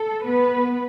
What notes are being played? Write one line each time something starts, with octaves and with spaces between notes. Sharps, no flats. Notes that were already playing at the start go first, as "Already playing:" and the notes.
Already playing: A4
B3 B4